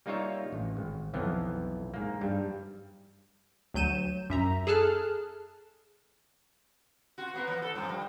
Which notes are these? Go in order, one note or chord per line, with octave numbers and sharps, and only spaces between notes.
G3 A#3 D#4 F4 C#5 E5
A1
G#1
B1 F2 E3 F3 B3
G#2 A#3
G2 G3
D2 F#3 G6 D#7 E7
F#2 E5 A#5
G#4 A4 A5 F6 F#6
F4 F#4
A#3 B3 A#4
E3
A4
G2 F3
G3